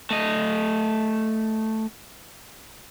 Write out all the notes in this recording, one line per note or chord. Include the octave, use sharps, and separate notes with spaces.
A3 D#5